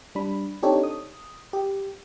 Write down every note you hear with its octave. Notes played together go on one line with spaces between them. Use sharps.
G3 D4 B5
C4 D4 D#4 G4 A4 C#5
D#6
G4